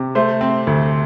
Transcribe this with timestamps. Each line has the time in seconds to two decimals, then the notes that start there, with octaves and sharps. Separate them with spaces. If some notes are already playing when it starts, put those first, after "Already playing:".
Already playing: C3
0.15 A3 C5
0.41 C4
0.67 D2